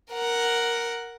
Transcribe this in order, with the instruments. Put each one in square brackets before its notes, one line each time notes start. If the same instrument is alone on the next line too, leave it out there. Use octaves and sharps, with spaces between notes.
[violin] A#4 F#5